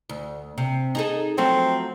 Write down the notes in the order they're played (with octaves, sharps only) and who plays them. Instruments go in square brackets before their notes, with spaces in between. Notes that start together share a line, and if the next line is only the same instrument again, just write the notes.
[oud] D2
C3
D#4 G#4 A4
[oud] F3 F#3 A3 [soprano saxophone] C4